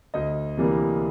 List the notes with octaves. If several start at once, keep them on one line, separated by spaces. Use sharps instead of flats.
D2 D#5
C3 E3 G3 A#3